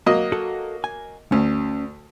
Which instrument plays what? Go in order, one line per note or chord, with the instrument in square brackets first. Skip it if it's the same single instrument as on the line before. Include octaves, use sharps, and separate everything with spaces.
[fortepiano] F#3 A#3 D#5
[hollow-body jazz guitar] F#4 A4
G#5
[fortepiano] D2 [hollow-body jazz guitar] C#4